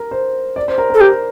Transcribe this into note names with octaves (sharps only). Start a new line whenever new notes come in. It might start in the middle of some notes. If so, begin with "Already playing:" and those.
Already playing: A#4
C5
D5
C5
A#4
A#4
A4
G4 A#4